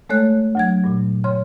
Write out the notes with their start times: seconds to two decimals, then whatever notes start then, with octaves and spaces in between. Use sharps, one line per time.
0.09 G#3 A3 A4 C#5 F#6
0.55 D2 F#3 G#6
0.84 G2 A#2
1.24 C#3 C#5 C6